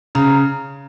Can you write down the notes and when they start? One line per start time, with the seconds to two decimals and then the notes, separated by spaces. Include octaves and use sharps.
0.15 C#3 A#5